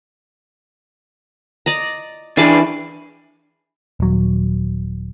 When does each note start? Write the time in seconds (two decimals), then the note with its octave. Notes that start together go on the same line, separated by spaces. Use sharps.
1.66 D5 D#5 A#5
2.37 E3 D4 G#4 B4 A5
4.00 D#1 F#3